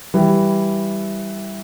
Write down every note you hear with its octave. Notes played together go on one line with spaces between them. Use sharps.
E3 G3